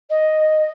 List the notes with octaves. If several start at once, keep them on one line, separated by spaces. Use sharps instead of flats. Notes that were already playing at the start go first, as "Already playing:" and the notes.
D#5